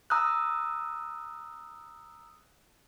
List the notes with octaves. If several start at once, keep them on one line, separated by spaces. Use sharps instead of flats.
A#5 D#6 E6 F#6